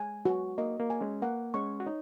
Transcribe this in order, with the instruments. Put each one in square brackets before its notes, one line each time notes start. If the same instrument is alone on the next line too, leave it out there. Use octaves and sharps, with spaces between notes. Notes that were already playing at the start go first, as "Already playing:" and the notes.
Already playing: [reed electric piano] G#3 [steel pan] G#5
[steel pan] F#4
[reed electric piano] A#3 [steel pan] D#5
[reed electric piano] A#3
[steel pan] G#5
[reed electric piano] G#3 C#4
[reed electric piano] A#3 [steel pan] F#5
[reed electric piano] G#3 C#4 [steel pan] C#6
[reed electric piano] F#4
[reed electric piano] D#4 [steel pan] C#5